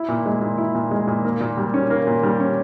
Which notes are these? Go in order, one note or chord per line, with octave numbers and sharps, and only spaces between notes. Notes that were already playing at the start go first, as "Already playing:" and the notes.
Already playing: E4
A#2
G#3
A#2
E4
A#2
G#3
A#2
A#3
A#2
G3
C#4
A#3
A#2
G3
C#4